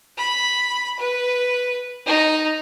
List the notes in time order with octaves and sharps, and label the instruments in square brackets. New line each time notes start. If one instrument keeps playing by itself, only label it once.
[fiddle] B5
B4
D#4